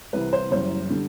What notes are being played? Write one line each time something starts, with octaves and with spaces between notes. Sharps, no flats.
C2 C3 E3 G3 B4
C5
F#1 F#2 E3 G3 C5
D3 G3